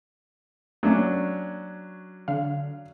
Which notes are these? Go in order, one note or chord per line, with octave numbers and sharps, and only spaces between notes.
F#3 A3 A#3 C#4 D4
D3 F5